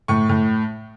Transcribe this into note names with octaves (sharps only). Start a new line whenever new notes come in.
A2 C#6
A2